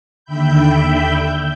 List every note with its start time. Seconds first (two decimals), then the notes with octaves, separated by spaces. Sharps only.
0.25 D#2 D3 E5 G5 B5 G6